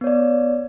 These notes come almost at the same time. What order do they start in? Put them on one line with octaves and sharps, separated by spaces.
B3 C#5 D5